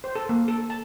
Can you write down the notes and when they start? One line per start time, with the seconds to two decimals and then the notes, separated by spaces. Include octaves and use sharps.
0.04 C5
0.15 A4
0.29 A#3
0.48 A4
0.70 A5